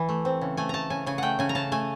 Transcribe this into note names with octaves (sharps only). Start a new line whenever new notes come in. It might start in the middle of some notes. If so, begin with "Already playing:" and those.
Already playing: E3
A3
C4
C#3
A3 G#5
A3 A5 A#5
C#3 G#5
C#3 G#5
A3 F#5 G5
C#3 G#5
A#5
C#3 A5
A3 G#5